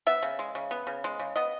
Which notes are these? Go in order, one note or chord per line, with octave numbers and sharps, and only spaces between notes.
B3 E5
C#3
G#3
C#3
B3
C#3
G#3
C#3
B3 D#5